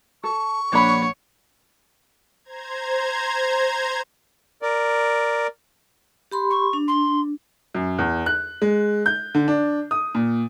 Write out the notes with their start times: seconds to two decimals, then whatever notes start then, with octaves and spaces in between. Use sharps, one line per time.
0.24 A4 C#6
0.73 A#1 D4 C#5 F#5 B5
2.44 C5 A#5 G#6
4.62 A#4 D5
6.31 G4 B5 C6
6.50 C#6
6.73 D4
6.87 C6
7.74 F#2
7.98 E2
8.26 F#6
8.62 G#3
9.06 G6
9.34 D3
9.48 D4
9.91 D#6
10.15 A#2